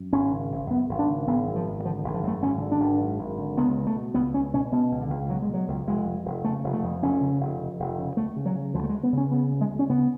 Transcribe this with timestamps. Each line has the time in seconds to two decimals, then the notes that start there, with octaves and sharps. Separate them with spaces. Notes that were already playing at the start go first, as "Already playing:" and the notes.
Already playing: F#2
0.12 G#1 C#4
0.31 C#3
0.51 G#1
0.70 F#2 B3
0.89 G#1
0.99 D4
1.08 C#3
1.27 G#1 B3
1.46 F#2
1.56 F3
1.66 G#1
1.85 D3 F3
2.04 G#1
2.14 F3
2.23 F#2 A3
2.42 G#1 C#4
2.61 D3
2.72 D4
2.80 G#1
3.00 F#2
3.19 G#1
3.38 D3
3.57 C#2 B3
3.76 B2
3.87 A3
3.96 B2
4.14 C#2 B3
4.34 C#2 C#4
4.54 B2 C#4
4.72 B2 B3
4.91 C#2
5.01 D3
5.10 C#2
5.29 B2 F#3
5.42 G#3
5.49 B2 F#3
5.68 C#2
5.87 F1 G#3
6.06 F2
6.25 F1
6.44 C#3 A3
6.64 F1
6.73 A3
6.83 F2
7.02 F1 C#4
7.21 C#3
7.40 F1
7.59 F2
7.79 F1
7.99 C#3
8.17 D2 A3
8.36 C#3
8.46 F#3
8.55 C#3
8.74 D2 F3
8.83 A3
8.89 G#3
8.94 D2
9.03 B3
9.12 C#3
9.18 C#4
9.31 C#3 B3
9.51 D2
9.61 G#3
9.70 D2
9.79 C#4
9.89 C#3 B3